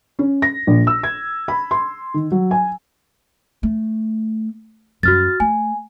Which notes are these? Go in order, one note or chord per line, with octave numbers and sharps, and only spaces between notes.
C#4
A#6
A#1
E6
G#6
B5
C6
D#3
F#3
G#5
A3
F#2 G3 F#4 F6 A6
A3 G#5